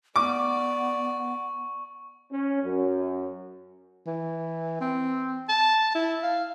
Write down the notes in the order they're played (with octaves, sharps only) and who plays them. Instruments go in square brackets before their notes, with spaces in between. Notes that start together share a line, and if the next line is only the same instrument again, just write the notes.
[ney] B3 [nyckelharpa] D5 [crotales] C#6 [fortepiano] D6
[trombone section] C#4
F#2
[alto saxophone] E3
C4
A5
E4
F5